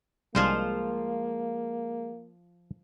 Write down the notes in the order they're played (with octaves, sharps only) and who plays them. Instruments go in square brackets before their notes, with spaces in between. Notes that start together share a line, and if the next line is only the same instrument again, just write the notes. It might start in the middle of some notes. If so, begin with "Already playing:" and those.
[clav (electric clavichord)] C2 G3 D4 [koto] F3 F4 C5 [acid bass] G#3 [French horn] A#3